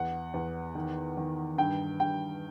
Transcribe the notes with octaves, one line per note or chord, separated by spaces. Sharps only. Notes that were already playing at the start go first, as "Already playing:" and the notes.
Already playing: E2 F#5
E2
D#3
D#3
G2 G5
G2 G5